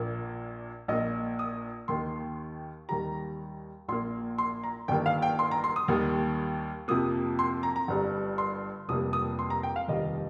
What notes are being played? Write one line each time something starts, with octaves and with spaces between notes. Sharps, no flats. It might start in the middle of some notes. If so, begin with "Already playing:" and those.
Already playing: A#1 A#2 A#3
A#1 A#2 A#3 D#5
D#6
D#2 D#3 A#3 C6
D#2 D#3 G3 A#5
A#1 A#2 A#3 C6
C6
A#5
G1 G2 D#3 A#3 G5
F5
G5
C6
A#5
C6
D#6
D#2 D#3 G3 A#3
F2 C3 F3 A#3 D#6
C6
A#5
A#5
G1 G2 G3
C6
F1 F2 C3 G3 A#3 D#6
D#6
C6
A#5
G5
F5
F1 D#2 D#3 G3 D#5